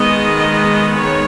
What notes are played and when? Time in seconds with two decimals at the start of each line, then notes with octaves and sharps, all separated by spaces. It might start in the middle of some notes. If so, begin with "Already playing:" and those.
Already playing: D#3 G#3 B3 D#5
0.97 C#5